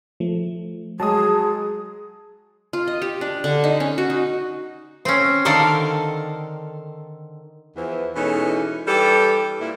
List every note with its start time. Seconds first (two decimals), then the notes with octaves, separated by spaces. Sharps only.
0.20 F3 A3
1.00 F#3 G#3 G#4 A5 D#6
2.73 F4
2.87 D#5
3.02 G4
3.21 D4
3.44 D3
3.64 D#4
3.80 C#4
3.98 F#4
4.10 D#4
5.05 C4 C#4
5.45 D3 D#3 A4 A#4 D5 F5
7.76 E2 E3 F3
8.16 B2 E3 G#3 C#4 D#4 A4
8.88 E3 G3 D4 G4 A4
9.60 A#2 E4